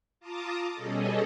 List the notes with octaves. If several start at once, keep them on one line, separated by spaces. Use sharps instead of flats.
F4 A5 A#5 D6 D#6
B2 G3 C#4 G#4 A4 D#5